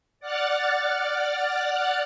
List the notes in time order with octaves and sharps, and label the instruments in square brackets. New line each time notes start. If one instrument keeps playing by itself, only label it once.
[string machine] D5 F#5 F6 F#6 A6